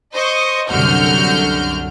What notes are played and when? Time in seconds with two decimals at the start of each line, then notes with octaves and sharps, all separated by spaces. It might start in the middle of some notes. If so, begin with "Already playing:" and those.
0.14 C5 D#5 C#6
0.70 C2 F#2 D3 F#4 F6 G6